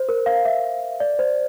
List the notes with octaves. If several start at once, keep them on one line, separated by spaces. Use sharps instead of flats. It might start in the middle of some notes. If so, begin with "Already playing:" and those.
Already playing: C5
A#4
F5
E5
D5
C5